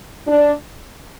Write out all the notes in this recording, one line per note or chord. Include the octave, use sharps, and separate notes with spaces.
D4